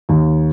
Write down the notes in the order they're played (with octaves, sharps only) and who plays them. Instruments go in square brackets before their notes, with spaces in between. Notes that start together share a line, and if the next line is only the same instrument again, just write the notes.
[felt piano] D#2